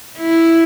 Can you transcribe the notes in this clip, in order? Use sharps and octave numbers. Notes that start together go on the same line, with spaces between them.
E4